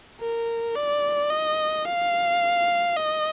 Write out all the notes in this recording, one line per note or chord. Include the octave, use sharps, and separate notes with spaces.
A#4
D5
D#5
F5
D#5